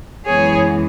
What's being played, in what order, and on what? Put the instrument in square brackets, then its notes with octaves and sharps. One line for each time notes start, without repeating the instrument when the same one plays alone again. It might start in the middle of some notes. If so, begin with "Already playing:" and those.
[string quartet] F#2 E3 G#3 B3 G#4 C#5